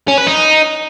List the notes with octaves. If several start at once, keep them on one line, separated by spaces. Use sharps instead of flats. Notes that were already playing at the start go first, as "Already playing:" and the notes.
C#4
B4
D#4